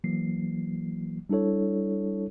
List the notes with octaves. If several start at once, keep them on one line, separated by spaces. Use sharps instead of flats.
E3 F#3 A#3 C7
G3 D4 E4 A4 C#5